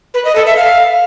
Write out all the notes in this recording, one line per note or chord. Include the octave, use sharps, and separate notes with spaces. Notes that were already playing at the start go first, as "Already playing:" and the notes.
B4
D#5
A4
E5
F5